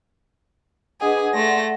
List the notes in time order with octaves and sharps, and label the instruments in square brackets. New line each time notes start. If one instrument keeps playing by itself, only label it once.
[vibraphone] D4 D#5 F#5 [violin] G#4 B4
[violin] A3 A#6 [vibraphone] D5 F#5 C6